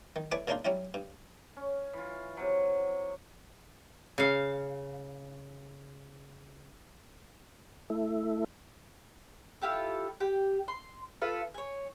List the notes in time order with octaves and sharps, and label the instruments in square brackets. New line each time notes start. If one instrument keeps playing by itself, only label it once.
[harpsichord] D#3
A3 E4 B4 C#5 D5 G#5
A#2 C#3 A#3 D4 D#4 F4
F#3 G3 C#4 E4
G2
[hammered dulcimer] C#4
E3 F4
C3 F#3
[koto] C#3 F5
[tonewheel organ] A3 E4
[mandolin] E4 F4 G4 A4
G4 G5
C6
F4 A4 B4 F5
C#5 G#5